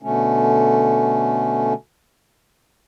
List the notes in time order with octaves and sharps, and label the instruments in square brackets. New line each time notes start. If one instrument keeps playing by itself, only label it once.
[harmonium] B2 D3 A3 C#4